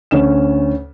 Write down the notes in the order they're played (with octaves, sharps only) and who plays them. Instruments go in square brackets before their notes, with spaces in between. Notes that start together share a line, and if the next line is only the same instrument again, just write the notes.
[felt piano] D2 C#4 E7